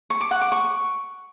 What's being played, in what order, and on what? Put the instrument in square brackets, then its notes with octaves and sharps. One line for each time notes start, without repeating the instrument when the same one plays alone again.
[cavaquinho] C#6
D6
F#5
D6
C#6